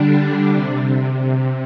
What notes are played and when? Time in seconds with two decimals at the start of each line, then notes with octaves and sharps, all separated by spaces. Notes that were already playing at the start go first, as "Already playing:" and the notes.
Already playing: D3 G3 D4
0.53 C3